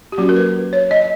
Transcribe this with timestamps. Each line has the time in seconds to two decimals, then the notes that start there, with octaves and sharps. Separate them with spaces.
0.12 G4
0.18 F#3 A#3 C#4 F#4
0.29 A#4
0.36 B4
0.73 C#5
0.91 D#5